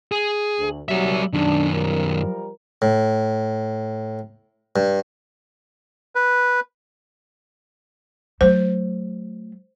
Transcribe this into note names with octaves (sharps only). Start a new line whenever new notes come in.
G#4
D2
D#2 C3 F#3 G3 E5
F#2 D#3 D4
F3 G3 A#4
A2
G2
B4
F#3 A3 C5